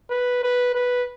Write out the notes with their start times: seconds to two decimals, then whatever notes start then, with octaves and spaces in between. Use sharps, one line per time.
0.10 B4
0.43 B4
0.75 B4